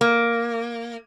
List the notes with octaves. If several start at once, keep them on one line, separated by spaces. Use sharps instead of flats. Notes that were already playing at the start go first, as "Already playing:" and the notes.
A#3